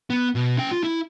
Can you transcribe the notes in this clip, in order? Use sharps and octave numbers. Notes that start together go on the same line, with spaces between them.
B3
B2
C#4 G5
F4
E4